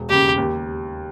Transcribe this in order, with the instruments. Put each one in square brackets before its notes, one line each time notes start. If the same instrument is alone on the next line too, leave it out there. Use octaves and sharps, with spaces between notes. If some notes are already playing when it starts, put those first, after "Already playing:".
Already playing: [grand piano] E1
[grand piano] D#2 C#3 [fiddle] G4
[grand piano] D#2